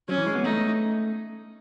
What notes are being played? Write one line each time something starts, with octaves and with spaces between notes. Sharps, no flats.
F#3 C#4
E3
G#3
B3
A3 D#4